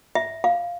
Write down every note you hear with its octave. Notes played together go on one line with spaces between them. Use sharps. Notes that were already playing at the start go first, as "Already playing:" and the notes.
E5
F5